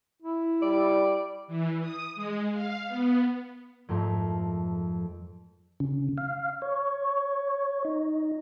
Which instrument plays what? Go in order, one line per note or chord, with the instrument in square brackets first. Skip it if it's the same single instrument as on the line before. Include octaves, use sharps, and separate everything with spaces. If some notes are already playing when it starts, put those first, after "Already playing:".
[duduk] E4
[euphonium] G3 [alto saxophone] D5
[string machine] E3
D#6
G#3
F5
B3
[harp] F2 G#2 A3 A#4 E5
[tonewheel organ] C#3
F5
C#5
D#4